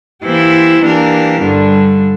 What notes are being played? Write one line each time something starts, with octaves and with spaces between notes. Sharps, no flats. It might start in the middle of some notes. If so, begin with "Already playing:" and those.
E3 A#3 E4 G4 C5
E3 A#3 D4 G4 A#4
G2 D3 G3 D4